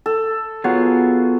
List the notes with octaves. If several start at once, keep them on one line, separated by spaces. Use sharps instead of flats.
A4
F#3 B3 F4 G#4